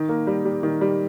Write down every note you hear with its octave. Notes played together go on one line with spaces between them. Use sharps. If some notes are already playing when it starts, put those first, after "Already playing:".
Already playing: D#3
A#3
G3
G3
D#3
G3